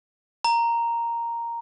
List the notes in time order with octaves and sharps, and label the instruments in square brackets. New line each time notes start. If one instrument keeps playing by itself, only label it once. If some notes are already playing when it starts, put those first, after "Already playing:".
[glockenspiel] A#5